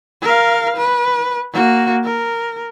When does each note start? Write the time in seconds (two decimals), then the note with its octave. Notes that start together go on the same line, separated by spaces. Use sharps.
0.22 A#4 F5
0.76 B4
1.53 A#3 F#4
2.04 A#4